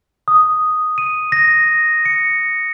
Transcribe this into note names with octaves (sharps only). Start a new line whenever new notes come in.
D#6
D#7
A#6
C#7